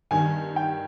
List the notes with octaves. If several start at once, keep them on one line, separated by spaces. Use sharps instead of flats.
G2 D#3 G3 G#5
G5